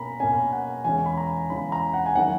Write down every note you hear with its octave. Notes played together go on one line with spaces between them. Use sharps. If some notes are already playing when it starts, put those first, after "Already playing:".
Already playing: B2 A#3 C#4 A#5 B5
B2 A#3 C#4 G#5
F#5
E2 C#3 E3 G#3 C#4 G#5
B5
A#5
E2 C#3 E3 G#3 C#4 B5
A#5
F#5
G#5
D#3 F#3 A#3 C#4 E4 F#5